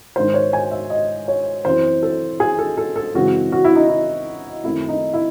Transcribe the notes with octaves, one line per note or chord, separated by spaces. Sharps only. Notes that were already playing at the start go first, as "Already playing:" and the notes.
G#2 D#3 G#3 C#4 C5
C#5
G#5
E5
D#5
C#5
F#2 E3 C4 C5
A4
G#4
A4
A4
A4
F#2 C#3 E3 G#3 C4 F#4
F#4
E4
D#4
E4
F#2 D#3 A3 C4 E4
D#4
E4